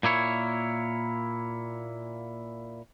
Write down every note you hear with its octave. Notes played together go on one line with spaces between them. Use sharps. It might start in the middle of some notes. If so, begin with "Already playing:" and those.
A#2 A#3 E4 C#5